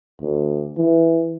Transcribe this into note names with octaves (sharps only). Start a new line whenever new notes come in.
D2
E3